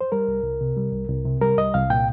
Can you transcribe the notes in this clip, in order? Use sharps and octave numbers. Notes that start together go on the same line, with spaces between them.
C5
G3 A#4
C2
C2
C3
G3
C2
C2
C3
G3 A#4
C2 D#5
C2 F5
A#2 G5